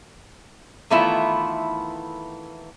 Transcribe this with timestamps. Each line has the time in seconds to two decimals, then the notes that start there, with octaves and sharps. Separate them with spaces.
0.90 D#3 E3 A3 B3 E4 F4